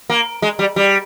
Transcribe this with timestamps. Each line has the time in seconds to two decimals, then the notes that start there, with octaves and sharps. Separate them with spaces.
0.10 A#3
0.42 G#3
0.59 G3
0.76 G3